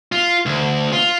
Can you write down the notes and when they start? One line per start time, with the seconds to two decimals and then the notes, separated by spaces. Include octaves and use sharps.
0.12 F4
0.46 D2
0.93 F4